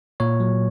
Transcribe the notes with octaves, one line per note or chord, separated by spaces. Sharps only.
A#2 C#5
F#3